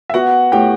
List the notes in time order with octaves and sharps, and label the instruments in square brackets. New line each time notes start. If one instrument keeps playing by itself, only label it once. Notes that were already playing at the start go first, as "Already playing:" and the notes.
[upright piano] E5
[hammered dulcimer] B3 [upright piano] F#4 F#5
[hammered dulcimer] A2 [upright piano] G4 G5